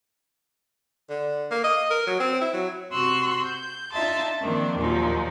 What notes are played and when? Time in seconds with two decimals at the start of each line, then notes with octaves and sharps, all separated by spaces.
1.10 D3
1.51 A#3
1.64 D#5
1.91 A#4
2.07 F#3
2.20 C4
2.42 E4
2.54 F#3
2.92 C3 F#4 C6 C#6 E6 F#6
3.43 G6
3.92 D4 D#4 F4 E5 A5 C6
4.42 D#3 F3 A#3 C4 D4
4.76 D#2 A#2 F3 F#3 D#4